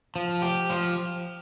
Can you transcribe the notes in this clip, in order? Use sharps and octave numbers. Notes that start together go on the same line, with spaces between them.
F3
G4
F3